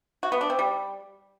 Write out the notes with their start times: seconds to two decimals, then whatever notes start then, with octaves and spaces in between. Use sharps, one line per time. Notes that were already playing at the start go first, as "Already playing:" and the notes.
0.23 F#4
0.32 B3
0.41 D4
0.50 C4
0.59 G3